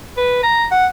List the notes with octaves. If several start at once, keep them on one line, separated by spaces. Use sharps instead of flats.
B4
A#5
F#5